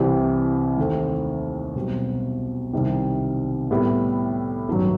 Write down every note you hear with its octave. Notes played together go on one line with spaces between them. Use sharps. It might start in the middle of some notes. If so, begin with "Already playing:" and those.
Already playing: C2 C3 E3 G3
D#2 D#3 A3 C4
B1 B2 G3 C4
C2 C3 D#3 G3
A2 G3 B3 E4 G4
A1 G2 D#3 F#3